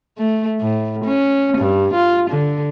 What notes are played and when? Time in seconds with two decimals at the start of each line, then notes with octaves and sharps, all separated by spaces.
0.18 A3
0.61 A2
1.04 C#4
1.58 G2
1.94 F4
2.30 D3